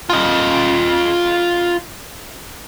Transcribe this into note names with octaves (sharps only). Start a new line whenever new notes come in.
F4 D#5